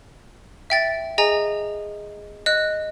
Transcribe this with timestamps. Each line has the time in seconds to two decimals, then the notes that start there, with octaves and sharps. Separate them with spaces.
0.70 E5 G5 A6
1.18 G#4 D#5 G#5 A#5
2.46 D#5 F#6